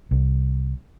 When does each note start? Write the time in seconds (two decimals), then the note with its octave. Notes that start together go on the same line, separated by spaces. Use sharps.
0.11 C2